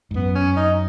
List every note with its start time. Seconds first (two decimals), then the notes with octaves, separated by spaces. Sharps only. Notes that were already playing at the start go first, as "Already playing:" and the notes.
0.11 G#2
0.14 F#2 B3
0.35 C#4
0.57 D#4